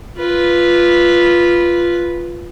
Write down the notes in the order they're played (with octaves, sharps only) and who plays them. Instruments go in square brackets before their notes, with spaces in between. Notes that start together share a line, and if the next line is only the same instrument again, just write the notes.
[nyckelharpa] F4 B4